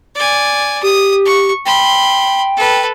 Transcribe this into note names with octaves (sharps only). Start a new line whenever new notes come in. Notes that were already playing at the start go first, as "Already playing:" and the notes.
D5 G#5
G4 D#6
C#6
G5 B5 C6
A4 B4